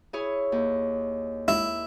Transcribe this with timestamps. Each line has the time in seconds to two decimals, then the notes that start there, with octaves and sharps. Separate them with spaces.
0.13 E4 G#4 C#5
0.52 D#2
1.48 E4